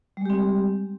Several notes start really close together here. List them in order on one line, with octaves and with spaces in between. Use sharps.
G3 G#3 G4 C4